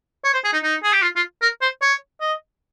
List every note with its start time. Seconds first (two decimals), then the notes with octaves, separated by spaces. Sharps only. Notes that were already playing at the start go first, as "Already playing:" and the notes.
0.24 C#5
0.34 C5
0.44 G#4
0.53 D#4
0.64 D#4
0.83 G#4
0.93 G4
1.02 F4
1.16 F4
1.42 A#4
1.62 C5
1.82 C#5
2.21 D#5